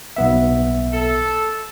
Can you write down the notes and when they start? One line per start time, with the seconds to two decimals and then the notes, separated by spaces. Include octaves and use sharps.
0.16 B1 B3 E5
0.93 A4